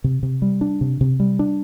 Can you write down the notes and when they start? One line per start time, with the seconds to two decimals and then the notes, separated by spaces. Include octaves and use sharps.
0.04 C3
0.23 C3
0.42 G3
0.61 D4
0.81 C3
1.01 C3
1.20 G3
1.39 D4